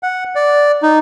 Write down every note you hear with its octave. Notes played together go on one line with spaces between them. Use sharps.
F#5
D5
D#4